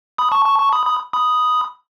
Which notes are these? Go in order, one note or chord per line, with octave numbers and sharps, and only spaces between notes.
B5 D#6
A5 C#6
A5 C#6
A5 C#6
B5 D#6
B5 D#6
B5 D#6